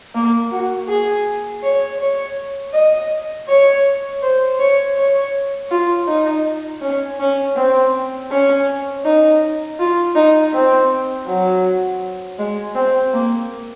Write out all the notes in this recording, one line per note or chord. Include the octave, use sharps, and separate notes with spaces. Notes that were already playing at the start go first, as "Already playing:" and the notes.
A#3
F#4
G#4
C#5
C#5
D#5
C#5
C5
C#5
C#5
F4
D#4
C#4
C#4
C4
C#4
D#4
F4
D#4
C4
F#3
G#3
C4
A#3